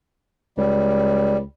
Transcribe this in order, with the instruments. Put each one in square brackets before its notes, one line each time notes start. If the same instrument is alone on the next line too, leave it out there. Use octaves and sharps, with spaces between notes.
[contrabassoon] C#2 [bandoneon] G3